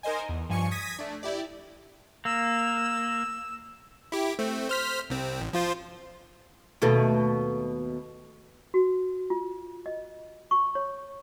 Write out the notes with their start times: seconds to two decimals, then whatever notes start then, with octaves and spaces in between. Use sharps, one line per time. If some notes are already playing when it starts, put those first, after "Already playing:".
0.03 D#4 A#4 C5 D#5 G#5
0.29 E2
0.49 G2 F3 G#5 C#6 C#7
0.71 D#6 G#6 A#6 B6 D#7
0.99 A3 D4
1.23 E4 G4 D5
2.25 A#3 E6
4.12 E4 G4
4.39 A3 C4
4.69 C5 F6 B6
5.10 C2 C4
5.41 A1
5.53 F3 F4 C5
6.82 D#2 B2 A3
8.74 F#4
9.30 F4
9.86 D#5
10.51 C#6
10.75 C#5